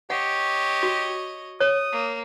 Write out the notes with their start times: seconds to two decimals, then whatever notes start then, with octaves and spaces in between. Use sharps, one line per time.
0.10 G4 C#5 D#5 F#5
0.83 F#4
1.60 C#5 D#6
1.92 A#3